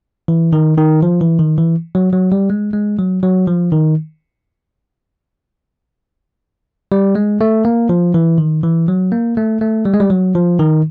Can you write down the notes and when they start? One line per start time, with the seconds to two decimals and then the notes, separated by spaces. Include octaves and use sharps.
0.28 E3
0.53 D#3
0.77 D#3
1.03 F3
1.21 E3
1.39 D#3
1.58 E3
1.95 F#3
2.13 F#3
2.32 G3
2.50 G#3
2.73 G#3
2.99 F#3
3.23 F#3
3.47 F3
3.72 D#3
6.92 G3
7.15 G#3
7.41 A3
7.65 A#3
7.89 F3
8.14 E3
8.38 D#3
8.63 E3
8.88 F#3
9.12 A#3
9.37 A3
9.61 A3
9.85 G3
9.94 G#3
10.00 G3
10.10 F#3
10.35 F3
10.59 D#3